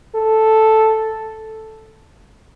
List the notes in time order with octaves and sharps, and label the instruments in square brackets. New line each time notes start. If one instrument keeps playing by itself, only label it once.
[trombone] A4